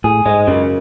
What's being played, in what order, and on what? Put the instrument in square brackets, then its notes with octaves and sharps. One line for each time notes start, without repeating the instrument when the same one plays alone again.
[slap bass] A2 [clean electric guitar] G#4
[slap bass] G#2 [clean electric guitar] G#3
[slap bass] F#2 [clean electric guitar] C#3